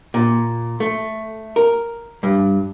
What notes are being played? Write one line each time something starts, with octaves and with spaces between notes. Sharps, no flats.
A#2
A3
A#4
G2